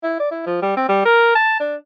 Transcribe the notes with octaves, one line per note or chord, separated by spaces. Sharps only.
E4
D5
E4
F3
G3
C4
G3
A#4
A5
D4